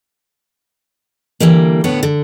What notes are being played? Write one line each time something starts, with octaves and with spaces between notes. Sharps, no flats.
D3 E3 G3 A#3
A2 D3 B3 C#5
D3